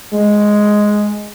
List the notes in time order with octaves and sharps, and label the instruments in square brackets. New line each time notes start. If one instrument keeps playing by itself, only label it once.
[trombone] G#3